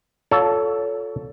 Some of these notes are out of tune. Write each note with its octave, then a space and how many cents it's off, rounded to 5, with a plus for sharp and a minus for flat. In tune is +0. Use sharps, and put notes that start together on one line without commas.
F4 +30 A4 +0 C#5 +30